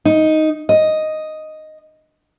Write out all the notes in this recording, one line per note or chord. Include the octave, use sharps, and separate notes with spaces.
D#4
D#5